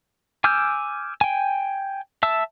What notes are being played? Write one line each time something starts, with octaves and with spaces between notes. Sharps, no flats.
G#5 D6 E6 F6 G6
G5 G#5
E5 A5 E6